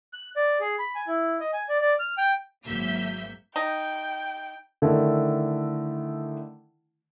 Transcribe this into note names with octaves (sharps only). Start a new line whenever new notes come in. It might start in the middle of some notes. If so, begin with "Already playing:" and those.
F#6
D5
G#4
B5
G#5
E4
D#5
G#5
D5
D5
F6
G5
G#1 F#3 A#3 E5 G6 B6
D#4 G5
D3 D#3 A3 D4 E4